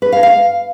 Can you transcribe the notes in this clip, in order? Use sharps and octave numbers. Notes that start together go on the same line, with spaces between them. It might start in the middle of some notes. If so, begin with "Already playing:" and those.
B4
F5
F5